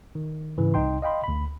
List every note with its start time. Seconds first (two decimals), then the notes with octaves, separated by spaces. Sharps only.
0.15 D#3
0.58 G#2 C#3 E3
0.74 C2 D#4 G5 C6
1.02 D#5 F5 G5 B5 C6
1.24 D2 B5